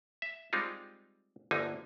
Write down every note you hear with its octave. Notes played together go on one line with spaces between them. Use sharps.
E5
G3 G#3 C4 D#4 F4
G1 D2 D3 A#3 D#4 G#5